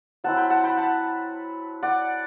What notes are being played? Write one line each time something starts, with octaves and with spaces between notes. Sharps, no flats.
F#3 C4 E4 F#5 A5
G5 B5
F#5 A5
G5 B5
F#5 A5
D5 F#5